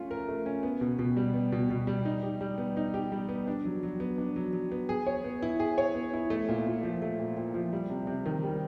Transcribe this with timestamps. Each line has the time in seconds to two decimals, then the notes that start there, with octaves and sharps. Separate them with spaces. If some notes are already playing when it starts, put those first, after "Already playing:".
Already playing: A3 C#4 F4
0.11 A#4
0.28 A3
0.46 C#4
0.63 B3
0.81 B2
0.99 B2
1.17 G3
1.34 B3
1.52 B2
1.70 B2
1.87 G3
2.05 D#4
2.23 G4
2.41 G3
2.58 B3
2.77 D#4
2.94 G4
3.12 G3
3.29 B3
3.47 D4
3.65 F#3
3.83 F#3
4.00 B3
4.18 D4
4.36 F#3
4.53 F#3
4.72 B3
4.89 G#4
5.07 C#5
5.24 B3
5.43 E4
5.60 G#4
5.78 C#5
5.95 B3
6.13 E4
6.30 A3
6.49 A#2
6.66 A#2
6.83 F3
7.02 A3
7.19 A#2
7.37 A#2
7.54 F3
7.73 G3
7.90 C3
8.07 C3
8.26 D#3
8.43 G3